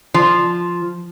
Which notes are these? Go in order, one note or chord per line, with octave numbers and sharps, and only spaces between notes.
F3